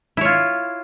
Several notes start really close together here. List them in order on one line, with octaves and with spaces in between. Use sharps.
E4 C#5 F4